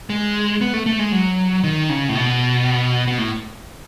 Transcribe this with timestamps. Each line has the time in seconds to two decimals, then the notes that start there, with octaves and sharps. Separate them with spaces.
0.10 G#3
0.61 B3
0.74 A3
0.86 A3
0.99 G#3
1.12 F#3
1.64 D#3
1.89 C#3
2.09 A2
2.15 B2
3.07 B2
3.18 A2